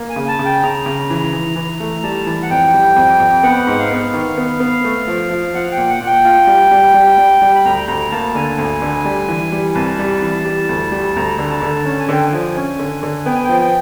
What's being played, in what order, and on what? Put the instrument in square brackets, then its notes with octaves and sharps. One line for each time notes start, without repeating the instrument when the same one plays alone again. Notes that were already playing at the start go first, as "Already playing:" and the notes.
Already playing: [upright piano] A#3
[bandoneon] G#5
[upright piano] C#3
[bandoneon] A5
[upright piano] C#3
[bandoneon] G5
[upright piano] C#3 [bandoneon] A#5
[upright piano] C#3
E3
E3
E3
A3
[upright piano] G3 [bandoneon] A5
[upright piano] E3
[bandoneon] F#5
[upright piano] F2 [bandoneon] G5
[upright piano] G3
F2
F2
[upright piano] B3 [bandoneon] F#5
[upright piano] G#2
[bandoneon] F5
[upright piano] B3
D#3
B3
B3
A3
F3
F3
[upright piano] F3 [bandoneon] F#5
[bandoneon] G5
[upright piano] A#2
[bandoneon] F#5
[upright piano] A#2
[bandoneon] G5
[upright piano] F4
G3
G3
G3
G3
G3
[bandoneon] B5
[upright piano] D2 [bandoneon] A#5
[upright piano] D2 [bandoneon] A#5
[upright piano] A#3 [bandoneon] A5
[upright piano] D3 [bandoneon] G#5
[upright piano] D2
D3
G3
E3
G3
[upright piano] C2 [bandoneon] A5
[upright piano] G3
E3
G3
D2
G3
[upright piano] D2 [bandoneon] A#5
[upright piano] D3
[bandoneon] A5
[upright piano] D3
[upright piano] C#4 [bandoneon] A5
[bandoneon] G#5
[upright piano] D3 [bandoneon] G5
[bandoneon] G#5
[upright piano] F3
C#4
D3
D3
[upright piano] B3 [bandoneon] G5
[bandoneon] G#5
[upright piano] F3 [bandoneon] G5
[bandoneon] G5